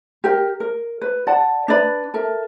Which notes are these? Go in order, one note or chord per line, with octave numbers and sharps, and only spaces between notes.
G4 A#4 G5
A#4
B4
D5 F#5 A5
D4 B4 D5 B5
A4 A#4 E5